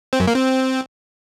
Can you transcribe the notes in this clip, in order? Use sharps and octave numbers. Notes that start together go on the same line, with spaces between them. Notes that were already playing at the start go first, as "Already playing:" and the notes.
C4
F#2
A#3
C4